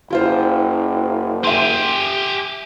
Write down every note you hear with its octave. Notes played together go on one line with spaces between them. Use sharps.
F#1 E4 F4 C5
G4 E5 G#5 C6